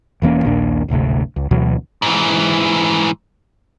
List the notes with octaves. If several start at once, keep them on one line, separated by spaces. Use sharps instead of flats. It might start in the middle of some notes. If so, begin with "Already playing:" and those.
E1 E3 A#3 C#4
A#1 D#2 A#2 D4
D1 G#1 D2 C3
C#2
D2 B2 E3 F#3
G#2 E3